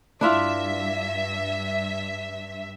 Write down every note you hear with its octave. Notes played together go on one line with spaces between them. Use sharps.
G2 D4 E4 F4 E5